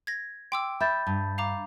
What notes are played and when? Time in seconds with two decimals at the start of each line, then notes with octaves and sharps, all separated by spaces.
0.07 G#6 A#6
0.52 G5 C6 D6 E6
0.80 E5 B5 G6 A6
1.07 G2
1.38 F5 A#5 D6